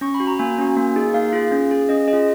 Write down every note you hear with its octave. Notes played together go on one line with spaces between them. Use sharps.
C#4 C#6
B5
F#4
A#5
A#3 G#5
C#4 F#4
A#3
D#4 G#4
A#3 F5
F4 G#4
C#4
G#4
C#4 D#5
G#4 D#5
F4